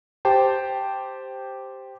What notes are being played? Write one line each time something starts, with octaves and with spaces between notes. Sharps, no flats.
G4 C5 G5 A5